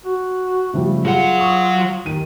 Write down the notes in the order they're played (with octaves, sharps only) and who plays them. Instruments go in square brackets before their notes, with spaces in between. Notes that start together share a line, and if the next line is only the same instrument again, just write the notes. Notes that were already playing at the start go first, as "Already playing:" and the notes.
[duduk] F#4
[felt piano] C#3 F3 G3 [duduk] A3
[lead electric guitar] F#3 F#5 [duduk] F4 [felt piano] G#4
[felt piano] C#6 D#6
[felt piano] D#2 D#7 [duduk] D#3